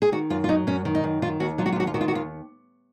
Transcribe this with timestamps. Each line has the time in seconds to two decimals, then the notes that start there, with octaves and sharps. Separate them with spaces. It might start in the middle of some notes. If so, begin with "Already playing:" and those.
0.02 G#4
0.12 D#3 F#4
0.30 F#2 F4
0.44 F4
0.49 F#3 D#4
0.67 F#2 C#4
0.85 D#3
0.95 D#4
1.04 F#2
1.22 D#3 F4
1.40 D#2 F#4
1.58 F#3 F4
1.66 F#4
1.72 F4
1.76 D#2 F#4
1.87 F4
1.94 D#3 F#4
2.01 F4
2.08 F#4
2.13 D#2 F4